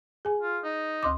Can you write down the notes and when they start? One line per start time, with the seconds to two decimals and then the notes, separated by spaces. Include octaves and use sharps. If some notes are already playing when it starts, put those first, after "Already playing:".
0.25 G#4 G#5
0.41 F4
0.64 D#4
1.03 D2 C6 D6